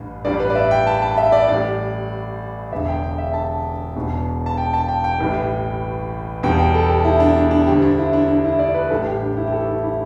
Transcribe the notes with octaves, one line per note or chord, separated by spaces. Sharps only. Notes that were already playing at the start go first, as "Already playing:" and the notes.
Already playing: A1 G2 G3
A1 G2 G3 D5
B4
D5
E5
G5
A5
A5
E5
D5
A1 A2 G3 D5
E1 E2 D3 E5
G5
G5
E5
A5
E1 E2 B2
A5
G5
A5
G5
G5
A1 A2 E3 G3
E2 B2 G3 G5
G5
A4
G4
E4
D4
D4
D4
D2 D3 G3 G4
D4
E4
D4
D4
E4
D5
B4
A1 A2 E3 G3 A4
G4
D4
E4
G4
A4
E4
E4